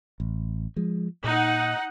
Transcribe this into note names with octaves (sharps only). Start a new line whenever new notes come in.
A1
F3 G#3
A#2 D#4 F#5